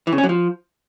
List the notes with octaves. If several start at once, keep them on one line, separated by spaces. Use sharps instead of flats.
E3
C#3
C#4
F#3
F3